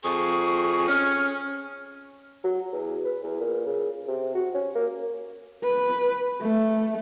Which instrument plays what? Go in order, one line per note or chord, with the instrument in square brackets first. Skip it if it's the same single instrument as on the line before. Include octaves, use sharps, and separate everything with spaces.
[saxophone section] F2 G#4 [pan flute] C#6
[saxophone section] C#4 [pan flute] F6
[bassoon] F#3
E2
B4
E2
A#2
C#3
C3
F#4
C#4
A#3
[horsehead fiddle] B4
A3